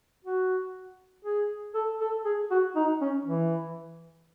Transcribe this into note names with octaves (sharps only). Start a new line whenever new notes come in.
F#4
G#4
A4
A4
G#4
F#4
D#4
C#4
E3